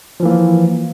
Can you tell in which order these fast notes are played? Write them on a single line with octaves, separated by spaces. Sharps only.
F3 E3 A#3